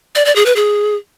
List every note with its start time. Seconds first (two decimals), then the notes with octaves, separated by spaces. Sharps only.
0.15 D5
0.25 D5
0.36 G#4
0.46 B4
0.56 G#4